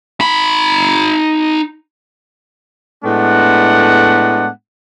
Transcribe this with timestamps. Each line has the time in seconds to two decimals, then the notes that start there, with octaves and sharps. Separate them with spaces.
0.21 D#4 B5
3.03 A2 G#3 A3 B3 D4 F#5